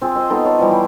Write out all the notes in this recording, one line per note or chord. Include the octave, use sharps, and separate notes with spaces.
C4 F4 G#4
C5 D#5
B3 D#4 A4
A4 C#5 F5
E3 F3 G3 E4
E4 C5 G5